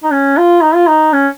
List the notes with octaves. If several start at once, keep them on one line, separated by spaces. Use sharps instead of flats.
D#4
C#4
F4
D#4
F4
D#4
C#4